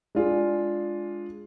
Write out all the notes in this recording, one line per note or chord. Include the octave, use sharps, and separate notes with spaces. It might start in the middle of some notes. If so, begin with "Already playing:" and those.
G#3 D4 F4 G#4